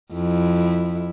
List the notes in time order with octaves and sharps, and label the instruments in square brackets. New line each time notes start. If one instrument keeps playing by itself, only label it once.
[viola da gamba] F2 E4